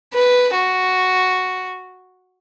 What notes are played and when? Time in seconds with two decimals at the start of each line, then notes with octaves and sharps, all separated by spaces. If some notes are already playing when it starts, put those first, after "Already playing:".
0.14 B4
0.55 F#4